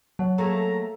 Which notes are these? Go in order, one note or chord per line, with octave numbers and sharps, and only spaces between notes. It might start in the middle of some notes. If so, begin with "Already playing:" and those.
F#3 C#5 F#5 A5
A3 A#3 G#4 A#5